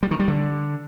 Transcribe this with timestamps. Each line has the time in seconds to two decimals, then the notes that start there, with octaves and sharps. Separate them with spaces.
0.03 G3
0.11 D#3
0.19 G3
0.28 D3